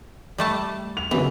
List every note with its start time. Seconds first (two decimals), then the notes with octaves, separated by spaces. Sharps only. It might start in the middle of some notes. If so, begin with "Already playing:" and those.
0.38 G3 A3 A5
0.97 F7
1.11 F#1 F#2 E3 B3